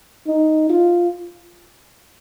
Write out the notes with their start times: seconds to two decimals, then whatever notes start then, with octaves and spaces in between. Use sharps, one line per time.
0.27 D#4
0.70 F4